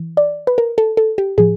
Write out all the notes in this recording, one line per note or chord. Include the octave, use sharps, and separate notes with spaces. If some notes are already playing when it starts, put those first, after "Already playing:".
Already playing: E3
D5
B4
A#4
A4
A4
G4
A2 F3 G#4